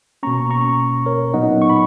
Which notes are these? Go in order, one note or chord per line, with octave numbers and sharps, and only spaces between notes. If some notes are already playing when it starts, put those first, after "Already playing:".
B2 A#3 C#4 A#5 C#6
A#5 C#6
A#4 C#5
A#2 F#3 B3 D#4 D#5 F#5
C#6
B5